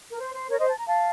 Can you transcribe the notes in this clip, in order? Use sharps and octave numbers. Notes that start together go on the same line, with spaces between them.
A#4
C5
C5
A#4 C#5
C5 D#5
A5
A#5
F5 A5